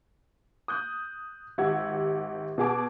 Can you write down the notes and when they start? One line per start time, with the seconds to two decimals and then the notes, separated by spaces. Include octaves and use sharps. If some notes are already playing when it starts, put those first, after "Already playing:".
0.68 D#6 F#6 G6
1.58 G#1 G4 F#5 E6 G#6
2.58 B2 F#4 G#4 A5 D6